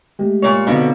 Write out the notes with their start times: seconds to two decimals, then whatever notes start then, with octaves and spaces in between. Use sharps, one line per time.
0.19 G#3 A3 G4
0.42 A#2 C#5
0.67 B2 D3 C4 D#4 F5